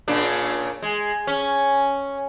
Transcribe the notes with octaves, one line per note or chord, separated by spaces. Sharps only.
A#2 C#3 D4
G#3
C#4